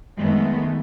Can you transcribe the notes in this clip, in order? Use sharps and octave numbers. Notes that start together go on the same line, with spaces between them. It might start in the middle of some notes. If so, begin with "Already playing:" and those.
F#2 D#3 G#3 A3 B3